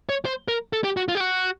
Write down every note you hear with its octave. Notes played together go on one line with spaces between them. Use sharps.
C#5
C5
A#4
A4
G4
F#4
F4
G4
F#4